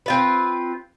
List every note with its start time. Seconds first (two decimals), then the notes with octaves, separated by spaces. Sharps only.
0.06 C4 F4 B4